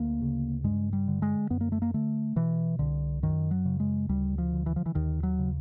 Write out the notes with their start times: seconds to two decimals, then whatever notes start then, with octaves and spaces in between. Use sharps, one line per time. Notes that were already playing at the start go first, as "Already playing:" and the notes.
Already playing: D2 A#3
0.22 C#3
0.64 G2 G#3
0.93 G3
1.08 D3
1.22 G#3
1.50 F#2 B3
1.61 A#3
1.72 A3
1.82 A#3
1.94 D3 A3
2.36 B2 E3
2.79 C2 D3
3.23 F#2 D#3
3.51 F#3
3.65 C#3
3.80 G#3
4.09 D2 G3
4.38 F3
4.53 D3
4.66 E3
4.76 F3
4.86 E3
4.95 D#2 D#3
5.23 F#3
5.39 C#3